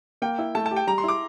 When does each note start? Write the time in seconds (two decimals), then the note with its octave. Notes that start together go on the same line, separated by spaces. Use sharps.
0.22 A#3 G5
0.39 E4
0.55 A3 A5
0.66 A5
0.71 G4
0.76 G5
0.87 G3 A#5
0.98 C6
1.04 E4 D6